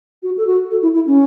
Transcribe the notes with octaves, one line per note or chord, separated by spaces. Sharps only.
F#4
A4
F#4
A4
E4
E4
C#4